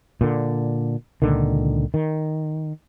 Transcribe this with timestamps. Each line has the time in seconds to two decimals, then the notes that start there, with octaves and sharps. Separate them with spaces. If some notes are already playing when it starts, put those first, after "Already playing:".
0.21 A#2 D3
1.22 C#2 A#2 D3 D#3
1.94 D#3